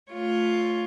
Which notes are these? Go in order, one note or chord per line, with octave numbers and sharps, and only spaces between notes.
A3 F4 C#5